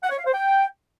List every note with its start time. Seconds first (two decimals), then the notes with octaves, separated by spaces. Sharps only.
0.03 F#5
0.11 C#5
0.18 F5
0.26 C5
0.33 G5